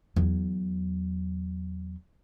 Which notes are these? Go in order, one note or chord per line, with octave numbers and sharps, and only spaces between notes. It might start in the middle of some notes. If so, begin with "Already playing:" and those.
E2 F#3